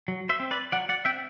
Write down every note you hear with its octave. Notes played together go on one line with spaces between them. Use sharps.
F#3
C5 E5
C4
B4 D5
F#3 D5 F#5
D5 F#5
C4 E5 G5